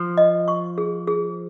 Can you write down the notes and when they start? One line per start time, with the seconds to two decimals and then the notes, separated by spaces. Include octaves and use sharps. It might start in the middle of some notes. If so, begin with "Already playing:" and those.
Already playing: F3
0.18 D#5
0.48 C#6
0.78 G#4
1.08 G#4